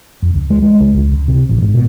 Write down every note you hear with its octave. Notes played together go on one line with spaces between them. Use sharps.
F2
C#2
G#3
G#3
C#2
C#2
C#2
C3
A1
G#2
B2